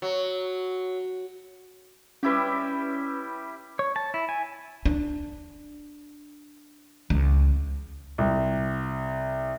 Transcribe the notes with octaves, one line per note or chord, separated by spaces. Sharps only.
F#3
G3 C#4 E4 G4 B4
C#5
A5
E4
G#5
D4
C#2
C2